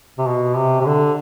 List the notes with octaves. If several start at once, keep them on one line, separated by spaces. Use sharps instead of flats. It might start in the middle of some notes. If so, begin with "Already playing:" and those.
C3
B2
C3
C3
D3